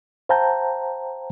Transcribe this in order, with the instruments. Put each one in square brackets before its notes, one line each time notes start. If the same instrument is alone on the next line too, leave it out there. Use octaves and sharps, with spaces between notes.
[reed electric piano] C5 F5 G5 A5 A#5 G6